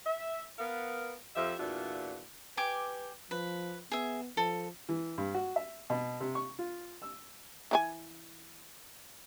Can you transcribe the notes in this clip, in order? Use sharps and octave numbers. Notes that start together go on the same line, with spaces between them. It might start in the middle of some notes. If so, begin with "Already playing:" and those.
E5
B3 A#4 F5
F2 F3 G4 E5
E2 A#2 D4 F4 F#4 E5
G4 B4 G#5 D6
F3 B4
B3 G#4 E5
F3 A4
E3
G2
F#4
E5
B2
C3
C#6
F4
E6
E3 D#4 G#5